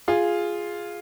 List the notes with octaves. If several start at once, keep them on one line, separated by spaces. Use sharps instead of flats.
F4 G#4